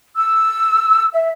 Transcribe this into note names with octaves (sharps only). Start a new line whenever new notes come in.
E6
E5